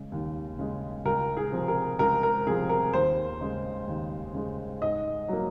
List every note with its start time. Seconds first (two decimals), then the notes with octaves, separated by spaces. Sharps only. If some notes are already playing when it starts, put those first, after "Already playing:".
Already playing: C#3 G#3
0.12 D#2
0.59 C#3 G#3
1.06 C#2 A#4
1.37 G#4
1.52 C3 F3
1.68 A#4
1.99 C#2 A#4
2.23 A#4
2.47 C3 F3 G#4
2.69 A#4
2.93 D#2 C5
3.41 C#3 G#3
3.87 D#2
4.34 C#3 G#3
4.81 G#2 D#5
5.28 F#3 A#3